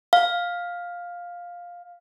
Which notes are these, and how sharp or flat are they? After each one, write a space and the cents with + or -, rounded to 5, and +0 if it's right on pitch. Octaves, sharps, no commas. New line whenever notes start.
F5 +10